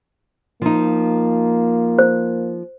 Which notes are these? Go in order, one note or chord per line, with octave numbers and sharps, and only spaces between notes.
F3 A#3 D#4
C5